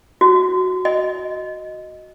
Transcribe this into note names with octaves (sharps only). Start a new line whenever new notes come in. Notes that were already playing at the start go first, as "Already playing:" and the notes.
F#4
D#5